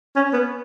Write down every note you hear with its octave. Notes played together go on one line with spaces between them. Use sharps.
C#4
B3